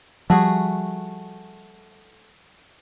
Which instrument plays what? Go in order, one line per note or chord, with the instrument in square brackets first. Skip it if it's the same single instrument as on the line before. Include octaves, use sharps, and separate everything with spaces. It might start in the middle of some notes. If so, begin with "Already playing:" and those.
[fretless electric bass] F3 G3 [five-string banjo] A3 F#4 G#4